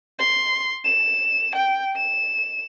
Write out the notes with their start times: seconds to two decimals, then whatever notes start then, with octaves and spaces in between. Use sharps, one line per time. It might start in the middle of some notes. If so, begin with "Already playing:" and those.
0.19 C6
0.85 E7
1.55 G5
1.96 E7